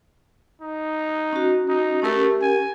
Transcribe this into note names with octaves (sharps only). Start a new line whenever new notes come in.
D#4
C#4 F#4
D#4
A3 C#4 G4 A#4
G#5